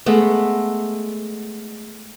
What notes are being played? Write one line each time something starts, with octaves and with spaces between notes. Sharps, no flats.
G#3 A3 B3